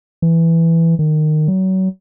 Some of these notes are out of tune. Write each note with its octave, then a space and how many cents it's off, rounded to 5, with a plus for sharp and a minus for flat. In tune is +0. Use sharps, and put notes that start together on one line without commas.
E3 +5
D#3 -20
F#3 +30